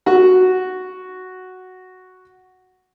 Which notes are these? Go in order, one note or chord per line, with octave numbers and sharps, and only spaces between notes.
F#4 F#5